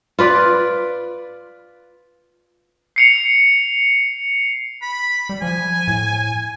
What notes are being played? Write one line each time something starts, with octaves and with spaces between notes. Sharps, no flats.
F4 B4 D5
C7 C#7 F7
B5
G3
F3 G#5
A2